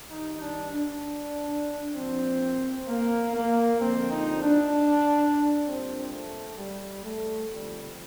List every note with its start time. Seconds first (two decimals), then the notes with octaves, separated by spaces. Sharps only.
0.10 G2 D#3 G3 D#4
0.42 D4
0.72 D4
1.96 A#2 F3 C4
2.89 A#3
3.35 A#3
3.81 F2 D3 F3 C4
4.12 D#4
4.43 D4
5.66 A#2 G3 C4
6.12 A3
6.59 G3
7.05 A3
7.51 F2 D3 F3 G3